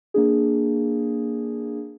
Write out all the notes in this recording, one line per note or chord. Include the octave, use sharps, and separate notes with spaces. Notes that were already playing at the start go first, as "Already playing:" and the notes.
A#3 D4 G#4